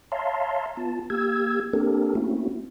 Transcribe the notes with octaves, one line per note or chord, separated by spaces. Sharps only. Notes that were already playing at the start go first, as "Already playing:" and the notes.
C#5 E5 F5 A5 A#5 C6
B3 F4 A5
A#3 G4 E6 G#6
A#3 C4 D4 G4 A4 A#4
A3 A#3 C4 C#4 E4 F#4